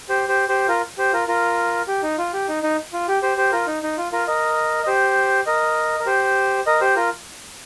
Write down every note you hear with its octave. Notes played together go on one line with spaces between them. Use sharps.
G4 C5
G4 C5
G4 C5
F4 A#4
G4 C5
F4 A#4
F4 A#4
G4
D#4
F4
G4
D#4
D#4
F4
G4
G4 C5
G4 C5
F4 A#4
D#4
D#4
F4
F4 A#4
A#4 D#5
D#5
G4 C5
A#4 D#5
A#4
G4 C5
A#4 D#5
G4 C5
F4 A#4